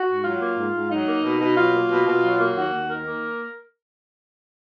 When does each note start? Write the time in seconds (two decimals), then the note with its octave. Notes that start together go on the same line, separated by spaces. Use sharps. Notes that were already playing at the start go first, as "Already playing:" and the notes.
Already playing: F#4
0.08 G#2
0.24 F#3 F4
0.41 A#3
0.58 G#2
0.74 G#2
0.91 F#3 D#4
1.08 A#3
1.24 B2
1.40 B2
1.57 F#3 F4
1.73 A#3
1.91 B2
2.07 B2
2.23 F#3
2.40 A#3
2.56 D#2 F#4
2.73 D#2
2.90 D#3 A#4
3.06 A#3